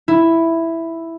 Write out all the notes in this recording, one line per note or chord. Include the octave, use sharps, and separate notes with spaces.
E4